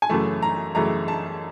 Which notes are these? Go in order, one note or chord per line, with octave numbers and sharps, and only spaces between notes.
G#5
F#2 C#3 E3 A3 A5
A#5
F#2 C#3 E3 A3 A#5
A5